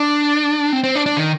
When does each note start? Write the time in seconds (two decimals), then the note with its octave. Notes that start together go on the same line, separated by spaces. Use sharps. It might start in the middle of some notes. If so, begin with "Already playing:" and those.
Already playing: D4
0.73 C4
0.84 C4
0.95 D4
1.06 D4
1.17 D#3